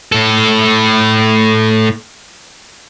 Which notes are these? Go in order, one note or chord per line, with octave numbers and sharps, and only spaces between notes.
A2 A4